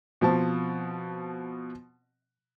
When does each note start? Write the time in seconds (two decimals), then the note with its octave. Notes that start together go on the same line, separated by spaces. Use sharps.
0.21 B2 F3 C4 A5